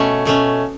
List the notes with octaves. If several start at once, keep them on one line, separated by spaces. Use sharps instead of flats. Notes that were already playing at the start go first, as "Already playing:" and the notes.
Already playing: B2 A3 C#4
B2 A3 C#4